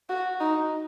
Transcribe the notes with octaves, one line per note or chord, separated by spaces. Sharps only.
F#4
D#4